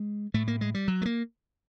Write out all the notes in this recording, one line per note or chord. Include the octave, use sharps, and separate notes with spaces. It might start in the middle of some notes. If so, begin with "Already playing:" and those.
Already playing: G#3
A2 A3
A#3
G#3
G3
F#3
A3
A#3